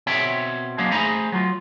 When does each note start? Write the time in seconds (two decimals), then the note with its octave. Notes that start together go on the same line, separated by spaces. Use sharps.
0.07 B2 C4 C#5 E5 G5
0.78 F#3 G#3 A#3 D4
0.91 A3 G#4 C5 G#5 A#5 B5
1.32 F#3 F4